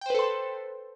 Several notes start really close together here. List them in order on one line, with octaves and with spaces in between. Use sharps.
G5 C5 B4 A4 C6